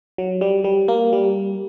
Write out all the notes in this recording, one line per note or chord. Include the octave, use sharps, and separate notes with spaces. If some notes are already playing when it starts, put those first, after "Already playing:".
F#3
G3
G3
A#3
G3